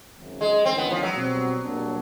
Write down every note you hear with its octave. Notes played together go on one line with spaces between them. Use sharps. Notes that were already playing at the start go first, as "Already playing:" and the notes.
G#1 F#2 C#3 F#3
G#3
G1 G2 D#3 G#3 C4 C#4
B3
F3
F#3
B2 G3 C4
B1 B2 G3 A#3 D4